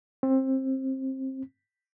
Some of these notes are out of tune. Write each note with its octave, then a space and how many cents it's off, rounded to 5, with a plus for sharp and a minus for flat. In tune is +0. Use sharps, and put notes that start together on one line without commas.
C4 +20